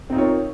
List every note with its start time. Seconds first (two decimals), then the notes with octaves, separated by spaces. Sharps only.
0.10 C4
0.12 D#4
0.15 F4
0.18 C#5
0.21 A#4